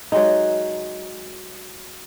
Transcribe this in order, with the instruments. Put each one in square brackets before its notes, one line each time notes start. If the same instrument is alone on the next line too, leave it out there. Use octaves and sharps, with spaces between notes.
[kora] F#3 G#3 D#4